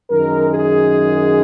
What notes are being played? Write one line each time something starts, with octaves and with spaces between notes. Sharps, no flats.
F#2 D#3 G#3 A#4
G#4